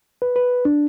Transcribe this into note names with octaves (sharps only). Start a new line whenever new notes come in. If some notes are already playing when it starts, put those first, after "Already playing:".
B4
B4
D4